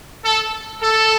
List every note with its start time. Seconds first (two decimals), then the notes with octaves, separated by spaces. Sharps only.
0.24 A4
0.81 A4